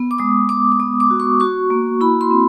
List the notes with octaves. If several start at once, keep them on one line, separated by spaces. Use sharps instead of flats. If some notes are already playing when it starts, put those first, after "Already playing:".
Already playing: B3
D6
G#3 D#6
G#3 D6
D6
B3 D#6
D6
F#4
C#6
F#4 C#6
A#3
E4 B5
C6
C4